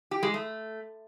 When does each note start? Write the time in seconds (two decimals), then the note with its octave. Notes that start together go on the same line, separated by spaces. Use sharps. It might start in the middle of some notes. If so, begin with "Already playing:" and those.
0.11 G4
0.23 G#3
0.34 A3